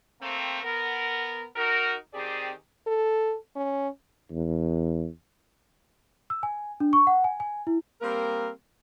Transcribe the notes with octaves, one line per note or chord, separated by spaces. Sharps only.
A3 A#3 C4
B3 A#4
D#4 F#4 A#4
D#3 C4 G4 G#4 D5
A4
C#4
E2
E6
G#5
D4
C#6
F#5
G#5
G#5
E4
G3 A#3 C4 A#4